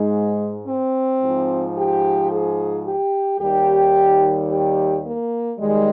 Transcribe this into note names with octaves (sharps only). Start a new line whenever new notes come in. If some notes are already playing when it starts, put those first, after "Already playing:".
Already playing: G#2 G#3
C4
G#2 F3
G4
G#4
G4
D#2 D#3 G3 G4
G4
A#3
D#2 D#3 G3 G#3